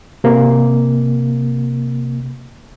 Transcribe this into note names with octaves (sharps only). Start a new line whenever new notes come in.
C3 A#3